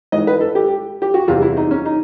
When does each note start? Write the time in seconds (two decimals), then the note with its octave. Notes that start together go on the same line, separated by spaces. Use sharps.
0.12 G#2 E3 D#5
0.27 B4
0.41 A4
0.55 G4
1.02 G4
1.14 F#4
1.28 E2 C3 E3 F4
1.42 E4
1.57 D#4
1.71 C#4
1.86 D#4